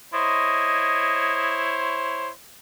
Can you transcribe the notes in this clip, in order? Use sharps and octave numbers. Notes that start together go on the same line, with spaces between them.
E4 C5 C#5 D#5